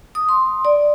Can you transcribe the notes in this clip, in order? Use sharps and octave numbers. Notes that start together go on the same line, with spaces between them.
D#6
C6
D5